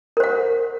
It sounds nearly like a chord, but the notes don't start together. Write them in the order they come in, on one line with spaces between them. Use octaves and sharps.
A#4 C5 F#5